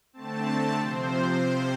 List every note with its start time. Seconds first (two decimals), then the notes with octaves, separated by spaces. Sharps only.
0.13 D3 A3 C4 A5
0.78 C3 F3 C4 C5